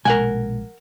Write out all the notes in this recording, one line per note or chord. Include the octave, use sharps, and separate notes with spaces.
A#1 B2 G#3 A#4 F#5 G#5